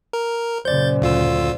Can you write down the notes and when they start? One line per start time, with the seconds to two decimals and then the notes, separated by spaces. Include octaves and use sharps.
0.13 A#4
0.65 F#2 A#2 C#3 C5 D5 G6 A6
1.02 D2 F4 E6